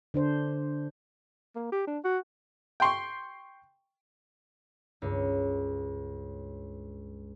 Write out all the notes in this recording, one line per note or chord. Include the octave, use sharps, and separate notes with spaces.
D3 D4 C5
A#3
G4
D4
F#4
G5 C6 C#6
C#2 G2